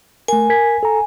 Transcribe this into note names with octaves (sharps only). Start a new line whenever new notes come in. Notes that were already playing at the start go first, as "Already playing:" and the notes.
A3 A#4 G#5
A#4 G#6 B6
A4 A#5